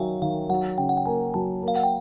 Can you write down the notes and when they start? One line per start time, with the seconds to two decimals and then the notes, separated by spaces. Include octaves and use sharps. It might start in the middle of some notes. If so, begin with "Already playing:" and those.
Already playing: D#3 F#3 E5 F5 G5 G#5
0.22 D#3 F5
0.49 F#3 F#5
0.78 C#3 G5
0.89 F#5
0.97 G5
1.06 A#3 G#5
1.34 F#3 A5
1.63 A#3
1.68 F5
1.76 F#5
1.83 G5